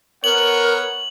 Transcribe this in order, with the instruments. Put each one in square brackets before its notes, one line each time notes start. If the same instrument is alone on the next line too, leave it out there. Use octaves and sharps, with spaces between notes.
[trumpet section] B3 C#5 F#5 [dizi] A#4 [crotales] F#7